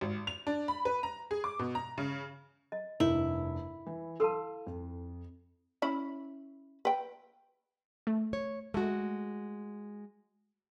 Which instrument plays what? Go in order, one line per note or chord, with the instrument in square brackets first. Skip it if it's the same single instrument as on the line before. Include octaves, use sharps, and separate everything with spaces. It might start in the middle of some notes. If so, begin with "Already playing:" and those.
[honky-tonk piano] G#1
F7
D4
B5
B4
A#5
G#4
D6
B2
A#5
C#3
[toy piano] D#5
[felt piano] F1 G2 [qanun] E4 [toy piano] A#4
[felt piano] E3
[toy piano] A4 B4 A5 [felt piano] F5 C6 E6
[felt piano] F2
[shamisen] C#4 E4 B5
B4 G5
[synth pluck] A3
[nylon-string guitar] C#5
[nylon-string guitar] G#3 F#4 [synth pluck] A3